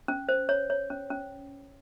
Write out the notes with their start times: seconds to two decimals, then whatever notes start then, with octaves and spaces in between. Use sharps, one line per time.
0.08 C#4
0.29 C5
0.49 C#5
0.70 C#5
0.90 C#4
1.11 C#4